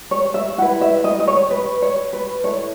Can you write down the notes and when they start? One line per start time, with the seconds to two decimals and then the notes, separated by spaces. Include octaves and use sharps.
0.11 C#5
0.34 E5
0.58 E4 F#5
0.62 B4
0.81 E5
1.04 D#5
1.20 D#5
1.27 C#5
1.51 B4
1.82 C#5
2.13 B4
2.44 E4 A4 C#5